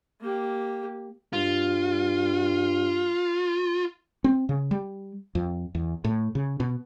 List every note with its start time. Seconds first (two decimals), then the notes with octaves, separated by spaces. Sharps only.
0.21 A#3 G4
1.33 G2 F4
4.24 C4
4.49 C#3
4.71 G3
5.35 F2
5.75 E2
6.04 A2
6.35 C#3
6.60 B2